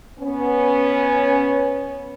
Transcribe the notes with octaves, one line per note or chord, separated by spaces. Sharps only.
B3 C#4